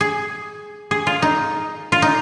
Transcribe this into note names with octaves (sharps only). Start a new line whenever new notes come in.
G#4
G#4
F4
D#4
F4
D#4